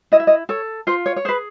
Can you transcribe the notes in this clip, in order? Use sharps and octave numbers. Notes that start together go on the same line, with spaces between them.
E4 D#5
E5
D#5
A4 C#5
F4 C5
C#5
C#5
G#4 B4 C5